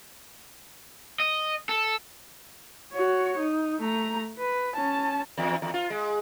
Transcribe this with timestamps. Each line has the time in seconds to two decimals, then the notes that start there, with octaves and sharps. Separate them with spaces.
1.20 D#5
1.69 A4
2.93 F#4 C#5
3.38 D#4
3.81 A3 A#5
4.38 B4
4.76 C#4 A5
5.38 E2
5.62 E2
5.74 F4
5.90 G#3